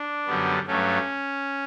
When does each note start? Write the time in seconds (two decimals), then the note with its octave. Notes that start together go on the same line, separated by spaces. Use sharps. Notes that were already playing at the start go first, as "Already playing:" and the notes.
Already playing: D4
0.27 F#2 D3 G3 B3
0.67 G2 F#3 A3 C#4